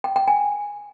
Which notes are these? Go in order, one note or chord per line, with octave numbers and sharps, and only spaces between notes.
G5
G5
G#5